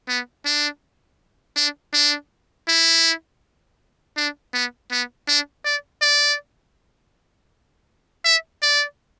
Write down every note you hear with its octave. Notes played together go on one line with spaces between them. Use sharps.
B3
D4
D4
D4
E4
D4
B3
B3
D4
D5
D5
E5
D5